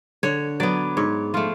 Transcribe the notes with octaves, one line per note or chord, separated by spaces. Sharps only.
D3 C#5
F#3 B3 D5
G#2 C#5
F3 A3 F4